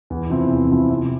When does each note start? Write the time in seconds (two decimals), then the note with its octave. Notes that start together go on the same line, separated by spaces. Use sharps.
0.10 E2
0.30 C3 F3 C4 E4
0.50 E2
0.70 C3 F3 C4 E4
0.90 C3